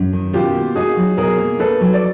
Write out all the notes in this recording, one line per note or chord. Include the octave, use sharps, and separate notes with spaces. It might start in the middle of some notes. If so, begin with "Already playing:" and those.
Already playing: F#2
D#3
B2 F4 G4
A#3
D#4 F#4 G#4
F#3
B2 G#4 A#4
A#3
D#4 A4 B4
F#3
D5